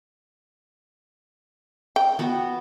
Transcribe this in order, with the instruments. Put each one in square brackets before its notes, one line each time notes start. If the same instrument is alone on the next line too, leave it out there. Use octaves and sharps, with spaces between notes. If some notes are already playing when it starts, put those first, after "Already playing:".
[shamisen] G5
[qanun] B3 F#4